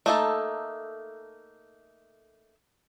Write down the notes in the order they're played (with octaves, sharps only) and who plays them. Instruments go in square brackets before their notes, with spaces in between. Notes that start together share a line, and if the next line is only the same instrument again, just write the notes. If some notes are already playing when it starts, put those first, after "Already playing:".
[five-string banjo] A3 A#3 D#4 G#4 A4